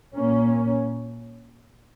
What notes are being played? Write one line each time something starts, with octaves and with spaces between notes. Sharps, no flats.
A#2 A#3 C#4